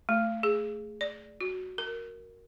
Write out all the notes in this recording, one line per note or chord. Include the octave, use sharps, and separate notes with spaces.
A3
G#4
D5
F#4
A#4